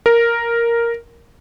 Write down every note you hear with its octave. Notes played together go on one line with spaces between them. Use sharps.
A#4